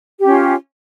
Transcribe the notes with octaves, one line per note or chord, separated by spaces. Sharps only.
C#4 F4 G4